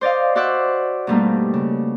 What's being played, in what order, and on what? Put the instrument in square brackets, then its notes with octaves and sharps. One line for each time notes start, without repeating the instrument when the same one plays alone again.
[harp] C5 D5 D#5 F5
F#4 C5 D5 E5 F#5
G2 B2 G3 A3 A#3 D#4
C#3